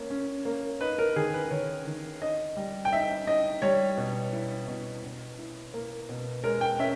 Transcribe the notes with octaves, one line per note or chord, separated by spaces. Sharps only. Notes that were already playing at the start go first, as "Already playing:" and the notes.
Already playing: A#3 C#4
C#4
A#3
D#4 B4
A#4
D#3 G#4
B4
D#3 C#5
D#3
D#4 D#5
G3
G5
D#4 E5
D#4 D#5
G3 C#5
B2
E4
B2
B2
E4
A#3
B2
G#3 A#4
G5
C#4 E5